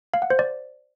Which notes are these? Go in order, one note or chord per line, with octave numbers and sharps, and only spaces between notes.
F5
F#5
C5
D5